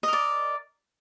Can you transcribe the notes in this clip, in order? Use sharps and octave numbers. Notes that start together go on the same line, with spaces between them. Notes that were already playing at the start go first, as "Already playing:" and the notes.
A#4 D5 D#5